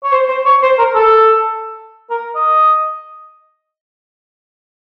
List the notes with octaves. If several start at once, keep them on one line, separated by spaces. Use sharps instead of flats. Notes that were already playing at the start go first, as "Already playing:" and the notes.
C#5
C5
C5
C#5
C5
A#4
A4
A#4
D#5